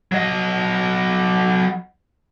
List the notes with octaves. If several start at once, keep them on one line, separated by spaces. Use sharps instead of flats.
F#3 D#5